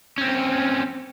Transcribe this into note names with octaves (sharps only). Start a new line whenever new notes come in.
C4 C#4